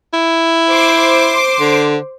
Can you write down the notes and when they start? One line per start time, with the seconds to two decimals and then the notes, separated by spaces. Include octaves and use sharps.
0.13 E4
0.71 C5 C6 D6
1.60 D3